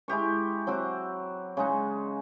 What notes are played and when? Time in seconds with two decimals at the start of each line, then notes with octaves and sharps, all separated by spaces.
0.08 G#3 E4 G4 C#6
0.67 F#3 C4 F#4 D6
1.57 C#3 G#3 D#4